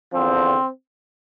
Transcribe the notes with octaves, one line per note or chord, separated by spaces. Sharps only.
E2 D3 F3 C4